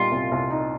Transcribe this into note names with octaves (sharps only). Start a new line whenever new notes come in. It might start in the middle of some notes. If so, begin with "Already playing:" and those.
Already playing: A#2 G3 D#4 F4
C2
C2
D#4